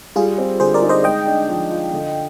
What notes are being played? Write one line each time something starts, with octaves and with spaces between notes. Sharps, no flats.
G3 F4 G#4
C4
D3 G#4 C5
A#4 D5
D#4
C5 D#5
G#3 D#5 G5
D4
F3
F4
D3